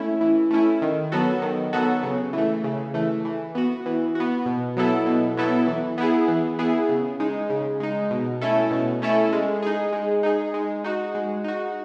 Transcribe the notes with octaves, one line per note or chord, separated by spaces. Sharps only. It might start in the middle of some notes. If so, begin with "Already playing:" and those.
Already playing: A3 C#4 E4
E3
A3 C#4 E4
D#3
F#3 B3 F#4 A4
D#3
F#3 B3 F#4 A4
C#3
E3 A3
C#3
E3 A3
E3
B3 F#4
E3
B3 F#4
B2
F#3 B3 E4 A4
B2
F#3 B3 E4 A4
E3
B3 E4 G#4
E3
B3 E4 G#4
C#3
G#3 D#4
C#3
G#3 D#4
B2
A3 C#4 E4 A4
B2
A3 C#4 E4 A4
G#3
D#4 G#4
G#3
D#4 G#4
G#3
D#4 F#4
G#3
D#4 F#4